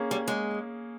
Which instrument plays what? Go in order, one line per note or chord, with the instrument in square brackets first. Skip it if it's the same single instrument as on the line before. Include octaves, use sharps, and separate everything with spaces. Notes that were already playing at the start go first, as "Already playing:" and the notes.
Already playing: [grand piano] A#3 C#4 G#4
[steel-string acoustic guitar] G3
G#3